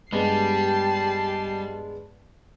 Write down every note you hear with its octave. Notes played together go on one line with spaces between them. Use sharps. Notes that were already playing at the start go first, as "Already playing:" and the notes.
G2 G3 G#3 B3 G4 A5 C7